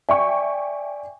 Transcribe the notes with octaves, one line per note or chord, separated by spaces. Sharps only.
D5 E5 G5 G#5 C#6